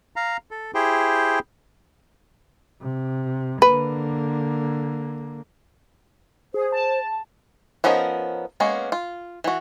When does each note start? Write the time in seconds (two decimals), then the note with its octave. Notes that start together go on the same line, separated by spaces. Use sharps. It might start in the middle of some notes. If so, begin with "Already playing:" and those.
0.16 F5 A#5
0.51 A4
0.74 E4 G4 G#4 C5 G5
2.81 C3
3.62 D3 A#3 B4
6.54 G#4 C5
6.72 A5
7.84 F3 B3 C#4 D#4 A#4
8.60 G#3 A#3 B3 C#4
8.92 F4
9.44 E3 F#4